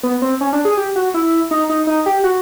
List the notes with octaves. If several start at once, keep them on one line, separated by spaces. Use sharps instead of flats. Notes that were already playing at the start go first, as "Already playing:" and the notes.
B3
C4
C#4
D4
G#4
G4
F#4
E4
D#4
D#4
D#4
G4
F#4